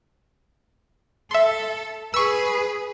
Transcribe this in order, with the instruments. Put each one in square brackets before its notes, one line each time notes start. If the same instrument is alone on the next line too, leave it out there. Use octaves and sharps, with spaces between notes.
[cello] A4 [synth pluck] E5 C6
[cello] G#4 B4 [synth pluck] C#6 E6